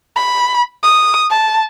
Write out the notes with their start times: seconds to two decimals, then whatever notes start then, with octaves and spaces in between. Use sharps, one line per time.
0.16 B5
0.83 D#6
1.30 A5